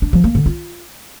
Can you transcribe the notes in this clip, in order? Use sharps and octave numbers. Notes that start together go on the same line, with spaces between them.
D4
F3
A#3
D3
F4